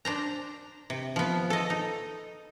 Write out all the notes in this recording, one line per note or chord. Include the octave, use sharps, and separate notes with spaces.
D4 C5 A#5
C3
F3 B3
A4 D#5
D#4